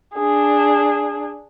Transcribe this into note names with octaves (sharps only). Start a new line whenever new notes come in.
D4 G#4